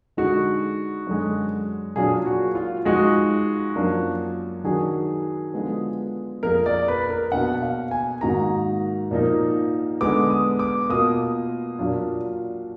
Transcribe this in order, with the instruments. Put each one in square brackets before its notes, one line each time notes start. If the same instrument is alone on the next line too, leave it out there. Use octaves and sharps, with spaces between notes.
[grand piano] D3 G#3 D#4 G#4 [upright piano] F#4
[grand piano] F#2 D3 G#3
[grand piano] A#2 F#3 A#3 D4 [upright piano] G#4
[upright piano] F#4
F4
[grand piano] F3 G#3 D#4 [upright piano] F#4
[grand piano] F#2 F3 A#3 D4
[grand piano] D#3 F#3 D4 F#4 [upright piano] G#4
[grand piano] D3 F3 G#3 B3
[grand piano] F2 F3 A#3 F4 G#4 [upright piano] A#4
[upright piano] D5
B4
A#4
[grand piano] B2 A#3 D4 [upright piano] F#5
[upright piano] F5
G#5
[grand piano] G#2 D#3 A#3 D#4 F#4 [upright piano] A#5
[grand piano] A#2 F3 A#3 D#4
[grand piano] D3 G#3 B3 [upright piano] D6
[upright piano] D#6
D6
[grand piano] B2 A#3 F4 [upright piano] D#6
[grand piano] A#2 F#3 D4 F4